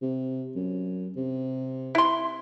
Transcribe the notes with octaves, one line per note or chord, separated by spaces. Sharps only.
C3
F#2
C3
E4 C6